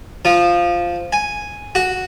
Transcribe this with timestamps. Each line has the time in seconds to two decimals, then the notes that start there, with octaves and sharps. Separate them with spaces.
0.25 F3
1.13 G#5
1.75 F#4